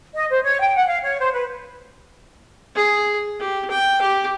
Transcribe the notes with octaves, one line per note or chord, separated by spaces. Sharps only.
D#5
C5
C#5
G5
F#5
F5
C#5
C5
B4
G#4
G4
G5
G4